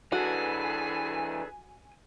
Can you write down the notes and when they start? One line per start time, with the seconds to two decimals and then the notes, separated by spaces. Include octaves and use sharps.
0.12 E3 D4 F#4 G#4 A4 B4 G#5